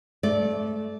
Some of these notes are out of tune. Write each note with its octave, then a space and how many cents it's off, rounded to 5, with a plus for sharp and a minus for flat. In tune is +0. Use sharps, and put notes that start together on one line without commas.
A3 -20 D5 -10